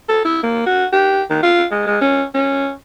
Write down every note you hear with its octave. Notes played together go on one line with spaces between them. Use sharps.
A4
E4
A#3
F#4
G4
D#3
F4
G#3
G#3
C#4
C#4